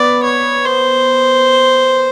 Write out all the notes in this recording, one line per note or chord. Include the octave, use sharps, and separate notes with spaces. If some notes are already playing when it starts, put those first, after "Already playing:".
Already playing: B3 D5
C#5
C5